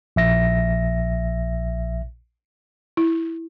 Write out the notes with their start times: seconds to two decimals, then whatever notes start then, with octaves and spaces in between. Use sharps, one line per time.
0.16 A#1 E5 A#6
2.97 E4